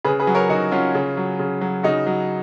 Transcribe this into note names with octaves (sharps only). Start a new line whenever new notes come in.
C#3 G#4 B4
G#4 B4
F#3
A#4 C#5
C#3 D#4 F#4
F#3 C#4 F4
C#3
F#3
C#3
F#3
C#3 D#4 F#4
F#3